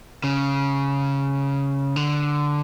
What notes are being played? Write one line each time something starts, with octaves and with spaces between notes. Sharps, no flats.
C#3
D3